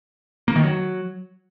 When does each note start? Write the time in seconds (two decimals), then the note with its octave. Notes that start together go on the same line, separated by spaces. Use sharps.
0.48 A#3
0.56 D#3
0.64 F#3